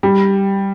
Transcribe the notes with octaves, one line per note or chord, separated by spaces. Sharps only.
G3